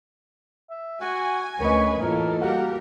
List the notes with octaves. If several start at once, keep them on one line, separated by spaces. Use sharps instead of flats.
E5
F#4 G#5
D2 C#4 A#4 B4 C#5 D#5
A2 E3 A#3 F4 A4 A#4 D#5
G3 F#4 G4 A#4 F5 F#5